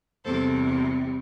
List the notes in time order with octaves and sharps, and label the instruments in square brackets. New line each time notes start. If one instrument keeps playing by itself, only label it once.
[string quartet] E2 C3 G3 C4 A4 C5